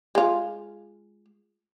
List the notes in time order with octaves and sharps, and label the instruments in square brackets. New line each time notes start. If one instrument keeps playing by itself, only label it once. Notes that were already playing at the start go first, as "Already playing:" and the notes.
[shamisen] G#3 F4